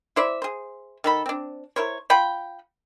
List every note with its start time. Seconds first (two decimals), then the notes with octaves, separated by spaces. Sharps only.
0.16 E4 C5 D5 E5
0.42 G#4 C5
1.04 D#3 A4 B5
1.26 C4 D4
1.76 E4 A#4 C5 C#5
2.10 F4 F#5 G5 B5